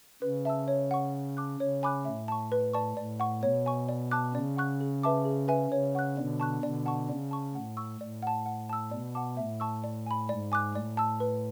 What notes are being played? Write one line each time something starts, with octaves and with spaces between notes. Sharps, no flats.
C#3 B4
E5 A5 E6
C#5
F#5 C#6
F#5
A5 D6 F#6
C#3 C#5
G#5 B5 D6 F#6
A2 E5
A5 C#6
B4
D5 A5 C#6
A2 D5
F#5 C#6
B2 C#5
G#5 C#6
D5
A5 D6 F#6
C#3 D5
F#5 C#6 F#6
G#4
B4 E5 A5 D6
G#4
B4 E5 G#5
C#3 C#5
F#5 C#6 F#6
B2 D3 D5
A5 C#6 F#6
B2 D3 D5
F#5 A5 C#6
C#3 D5
A5 C#6
A2 F#5
C#6 E6
A2 D5
F#5 A5
F#5
A5 E6
B2 D5
F#5 A5 D6
A2 E5
A5 C#6 E6
D5
G#5 B5
G#2 D5
G#5 D6 F#6
A2 D5
A5 E6
B4